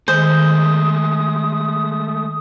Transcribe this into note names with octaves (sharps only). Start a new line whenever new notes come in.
D#3 G#3 A3 G#4 C5 D#6